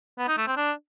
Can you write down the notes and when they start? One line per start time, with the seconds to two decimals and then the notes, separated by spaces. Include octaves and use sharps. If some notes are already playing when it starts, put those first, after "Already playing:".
0.18 B3
0.28 D#4
0.37 A3
0.47 C4
0.56 D4